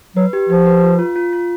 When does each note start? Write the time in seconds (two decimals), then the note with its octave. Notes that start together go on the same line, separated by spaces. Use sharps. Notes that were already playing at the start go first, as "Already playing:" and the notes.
0.16 F#3 B4
0.33 G4
0.49 F3 G4
0.66 B4
0.82 F4
0.99 F4
1.16 F4
1.33 F4